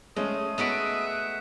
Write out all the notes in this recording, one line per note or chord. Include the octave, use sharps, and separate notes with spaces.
G#3 A3 C#4 D#6
B3 F#4 G#4 B4 D#5 E5 D7
F#5